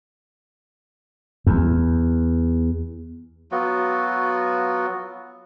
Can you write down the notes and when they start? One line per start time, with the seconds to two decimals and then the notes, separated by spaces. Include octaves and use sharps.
1.46 E2
3.52 F#3 B3 F4 F#4